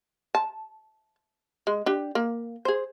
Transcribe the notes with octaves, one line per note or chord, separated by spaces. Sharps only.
A5
G#3
D4 G4
A#3
G#4 C5